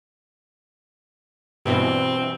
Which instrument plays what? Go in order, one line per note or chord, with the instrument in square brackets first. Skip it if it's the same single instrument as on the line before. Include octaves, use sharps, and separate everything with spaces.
[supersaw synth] G2 B2 E3 [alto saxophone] C4